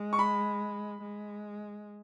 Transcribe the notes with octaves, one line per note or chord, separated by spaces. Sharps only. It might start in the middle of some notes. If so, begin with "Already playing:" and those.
Already playing: G#3
C#6
B5
G#3